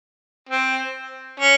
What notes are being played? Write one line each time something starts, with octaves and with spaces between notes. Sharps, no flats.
C4
C#4